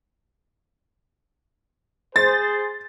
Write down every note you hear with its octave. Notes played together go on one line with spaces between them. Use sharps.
G#4 C5 A6